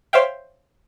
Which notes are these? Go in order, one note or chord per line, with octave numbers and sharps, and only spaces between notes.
C5 C#5 E5 F5 G5